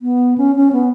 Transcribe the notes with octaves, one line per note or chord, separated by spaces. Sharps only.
B3
C#4
C#4
B3